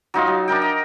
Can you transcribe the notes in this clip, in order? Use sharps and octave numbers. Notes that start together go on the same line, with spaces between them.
F#3 D#4 F4 D#5
F#3
D4 D#4 A#4 G5
D#5